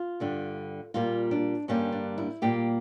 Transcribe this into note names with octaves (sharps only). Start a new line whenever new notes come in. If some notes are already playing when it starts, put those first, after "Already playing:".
Already playing: F4
G2 D3 G3
A#2 G3 A#3 F4
D4
G2 D3 G3 A#3 C#4
D4
E4
A#2 G3 A#3 G4